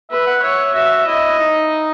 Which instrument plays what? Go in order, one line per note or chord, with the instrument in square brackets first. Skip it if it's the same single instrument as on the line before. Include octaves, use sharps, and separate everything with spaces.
[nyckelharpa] B4 [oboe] E5
[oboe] F#5
[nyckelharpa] C#5 [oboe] E5
[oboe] F#4 [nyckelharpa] E5
[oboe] E4 [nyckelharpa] D#5
[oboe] D#4